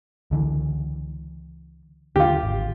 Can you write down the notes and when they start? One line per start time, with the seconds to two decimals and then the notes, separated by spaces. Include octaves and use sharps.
0.31 C#2 D3 E3
2.16 D#2 D3 F4 G4
2.43 G#1